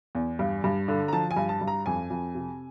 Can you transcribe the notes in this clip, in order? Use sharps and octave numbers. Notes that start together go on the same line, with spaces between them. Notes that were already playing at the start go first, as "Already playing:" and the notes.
E2
G2
G2
D3
A#5
F3 A5
G#5
G2
A5
G2
A#5
F2 G#5
F2
C3